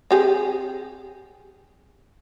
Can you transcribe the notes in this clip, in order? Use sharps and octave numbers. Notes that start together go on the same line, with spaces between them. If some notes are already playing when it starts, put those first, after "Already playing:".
C4 G4 G#4